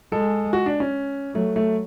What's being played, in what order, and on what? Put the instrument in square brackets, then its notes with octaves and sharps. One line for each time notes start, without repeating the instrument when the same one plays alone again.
[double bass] G#3 [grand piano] A4
[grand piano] F#4
D4
C#4
[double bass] F#3 [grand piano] A3
[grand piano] A3